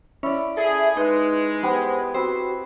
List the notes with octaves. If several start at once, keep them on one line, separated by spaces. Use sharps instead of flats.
C#4 E4 D5
G#4 A4 E5
G#3 D#4 B4
B3 G4 G#4 C5
C4 F#4 B4 C5